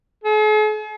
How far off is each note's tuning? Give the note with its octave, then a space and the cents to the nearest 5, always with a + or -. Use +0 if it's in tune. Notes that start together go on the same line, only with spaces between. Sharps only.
G#4 +45